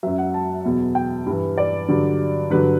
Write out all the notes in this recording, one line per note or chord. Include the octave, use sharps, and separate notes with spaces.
F#2 F#3 E5
F#5
A5
E2 B2 F#3
G5
G2 E3
D5
G2 D3 F#3
G2 D3 F#3 B4